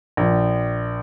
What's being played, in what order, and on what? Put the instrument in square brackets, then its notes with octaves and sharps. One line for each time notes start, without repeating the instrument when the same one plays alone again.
[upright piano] A#1